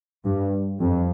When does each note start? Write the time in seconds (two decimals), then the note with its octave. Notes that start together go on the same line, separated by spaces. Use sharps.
0.24 G2
0.80 F2